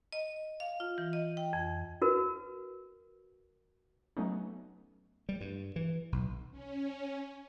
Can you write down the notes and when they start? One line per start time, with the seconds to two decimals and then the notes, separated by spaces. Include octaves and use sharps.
0.13 D#5
0.60 F5
0.80 F4
0.98 E3
1.13 D#5
1.37 G5
1.53 F2
2.02 F#4 A#4 B4
4.17 F#3 A3 B3 C#4 D#4
5.29 G3
5.41 G2
5.76 E3
6.12 B1
6.51 C#4